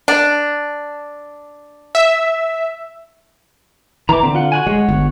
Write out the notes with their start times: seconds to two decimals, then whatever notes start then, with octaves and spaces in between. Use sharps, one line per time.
0.08 D4
1.95 E5
4.09 E3 A#5 D6
4.23 D3 C4
4.35 F4 F#5
4.52 F#4 F#5 G#5
4.67 G#3 C#5 F#5
4.89 G1